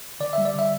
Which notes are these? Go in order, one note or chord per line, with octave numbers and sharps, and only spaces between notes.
D3 D5
G3 E5
D5
D3 E5